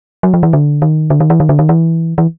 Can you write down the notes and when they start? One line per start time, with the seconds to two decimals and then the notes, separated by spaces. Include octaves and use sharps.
0.23 F#3
0.34 F3
0.43 E3
0.53 D3
0.82 D#3
1.10 D3
1.20 D#3
1.30 E3
1.40 D#3
1.49 D3
1.59 D#3
1.69 E3
2.18 E3